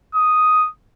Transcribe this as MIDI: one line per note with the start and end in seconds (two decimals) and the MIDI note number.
0.15 0.67 87